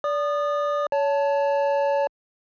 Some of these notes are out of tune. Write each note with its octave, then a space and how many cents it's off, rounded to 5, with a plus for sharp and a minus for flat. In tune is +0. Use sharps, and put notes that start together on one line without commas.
D5 -20 D#6 -30
C#5 +25 A5 +0